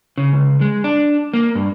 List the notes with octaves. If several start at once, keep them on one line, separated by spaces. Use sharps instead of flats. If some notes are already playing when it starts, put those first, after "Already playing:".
C#3
C#2
G#3
D4
A#3
G2